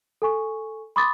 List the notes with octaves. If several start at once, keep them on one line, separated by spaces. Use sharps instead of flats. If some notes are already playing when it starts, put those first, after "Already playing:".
A4 G#5 C#6
B5 C6 D6 D#6 A6